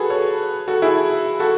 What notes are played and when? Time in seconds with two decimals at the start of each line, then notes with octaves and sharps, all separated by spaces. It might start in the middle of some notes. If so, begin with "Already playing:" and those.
Already playing: F#4 G#4 A4 B4
0.10 A4 C#5
0.68 F#4 A4
0.82 E4 G#4
1.40 F#4 A4